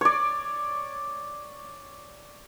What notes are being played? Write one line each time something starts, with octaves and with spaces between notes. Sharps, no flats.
C#5 D5